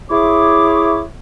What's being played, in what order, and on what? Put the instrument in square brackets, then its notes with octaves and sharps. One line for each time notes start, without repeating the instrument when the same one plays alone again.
[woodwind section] E4 G#4 C#5 D6